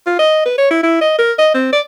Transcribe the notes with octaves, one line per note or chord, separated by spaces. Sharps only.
F4
D#5
B4
C#5
E4
E4
D#5
A#4
D#5
C4
D5